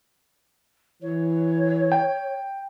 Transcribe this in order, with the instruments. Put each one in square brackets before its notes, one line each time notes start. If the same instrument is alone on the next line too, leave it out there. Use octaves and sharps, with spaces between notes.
[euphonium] E3 [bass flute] C#5
[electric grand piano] G5